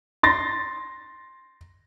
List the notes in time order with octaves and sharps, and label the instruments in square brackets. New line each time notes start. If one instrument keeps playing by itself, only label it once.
[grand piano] C6 A6 A#6